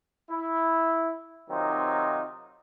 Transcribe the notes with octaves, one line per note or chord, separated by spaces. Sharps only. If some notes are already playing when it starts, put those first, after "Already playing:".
E4
C3 D#3 F#3 C4 D#4 F4